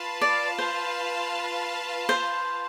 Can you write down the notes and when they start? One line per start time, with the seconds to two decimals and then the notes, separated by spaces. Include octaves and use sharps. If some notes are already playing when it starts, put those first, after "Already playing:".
Already playing: F4 B4 F5 A5
0.21 D5
0.58 C5
2.09 C5